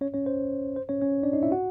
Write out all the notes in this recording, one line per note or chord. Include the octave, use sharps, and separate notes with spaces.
C#4 C#5
C#4 C#5
C5
C5
C#4 C#5
C#4 C#5
D4 D5
D#4 D#5
E4 E5
F#4 F#5